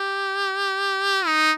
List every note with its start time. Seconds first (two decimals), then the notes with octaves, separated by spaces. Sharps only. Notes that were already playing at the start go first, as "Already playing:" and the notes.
Already playing: G4
1.26 D#4